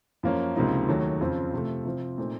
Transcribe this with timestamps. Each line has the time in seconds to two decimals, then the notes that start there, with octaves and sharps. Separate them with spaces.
0.23 F#2 F3 A#3 C#4
0.56 C#2 C3 F3 A#3 D#4
0.88 D#2 D#3 F#3 A3
1.21 F2 C#3 F3 C4
1.54 C3 F3 A3
1.85 C3 F3 C4
2.18 A#2 A3 C4 D#4